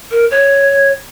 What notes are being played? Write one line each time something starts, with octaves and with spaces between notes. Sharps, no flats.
A#4
C#5